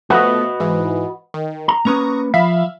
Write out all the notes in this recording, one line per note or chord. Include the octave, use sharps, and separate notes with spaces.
F3 A3 B3 F#4 B4 D#5
G#2 E3
D#3
A#5
A#3 C#4 B4 A#5 C#6 D#6
F3 E5 F5 B5